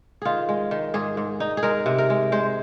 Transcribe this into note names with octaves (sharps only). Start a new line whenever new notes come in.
D#3 F4 G#4
G#3
D#3
G#2 G#4
G#2
D#4
G#4
G#3 A#4
C3
A#4
G#3
G#3 C5